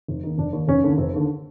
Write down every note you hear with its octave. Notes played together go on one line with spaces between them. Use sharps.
F1
D#2 D#3
F1 D4
D#2 D#3
F1 C#4
D#2 D3
F1 C4
D#2 D3